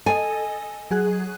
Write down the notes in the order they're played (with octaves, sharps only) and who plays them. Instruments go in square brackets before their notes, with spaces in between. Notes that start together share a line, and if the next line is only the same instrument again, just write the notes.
[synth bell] A4 D#5 [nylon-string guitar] G#5
[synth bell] F#3 G#4 F#6